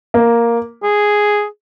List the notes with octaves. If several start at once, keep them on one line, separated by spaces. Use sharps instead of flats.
A#3
G#4